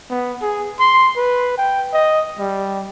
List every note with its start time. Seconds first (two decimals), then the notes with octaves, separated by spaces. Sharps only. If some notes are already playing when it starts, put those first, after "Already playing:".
0.10 B3
0.42 G#4
0.80 C6
1.17 B4
1.58 G5
1.93 D#5
2.39 G3